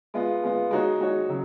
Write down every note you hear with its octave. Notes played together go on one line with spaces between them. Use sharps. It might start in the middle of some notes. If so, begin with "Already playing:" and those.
G#3 B3 F4
G#3 B3 F4
G#3 D#4 F#4 C#5
G#3 D#4 F#4 C#5
C#3 F#3